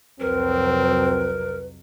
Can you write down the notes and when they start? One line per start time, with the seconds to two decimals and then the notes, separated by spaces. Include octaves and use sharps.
0.20 C2 F2 F#3 C4 A#4 B4